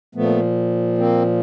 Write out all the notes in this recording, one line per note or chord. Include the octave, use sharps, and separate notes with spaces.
A#2 F3 A3 B3
A#3 C4